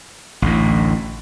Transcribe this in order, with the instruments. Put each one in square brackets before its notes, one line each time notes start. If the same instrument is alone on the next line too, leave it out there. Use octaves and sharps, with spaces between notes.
[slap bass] A1 D2 A2